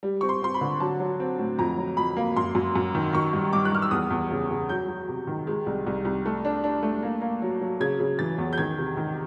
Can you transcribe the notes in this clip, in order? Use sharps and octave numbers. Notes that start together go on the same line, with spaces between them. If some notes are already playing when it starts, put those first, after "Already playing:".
G3
C4 C#6
C6
C4 C6
B5
D3
F#3 A5
F#3
C4
A2
F2 A#5
F#3
F2 B5
A#3
F#2 C6
F#2
F#2
D#3
D#3 C#6
G2
G2 D6
F#6
G2 F6
E6
E2 D#6
E2
C#3
C#3
F#3 G6
F#3
C3
D#3
G#3
C2
C2
C2
A3
D4
D4
A3
A#3
A#3
F#3
F#3
C#3 G#6
C#3
E3 A6
E2
G6
D#3 G#6
C3
D#3